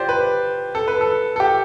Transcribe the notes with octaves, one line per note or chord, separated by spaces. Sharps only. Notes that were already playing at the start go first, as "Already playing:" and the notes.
Already playing: F4 G4 C5 D5
B4
A4
B4
A4
A4
G4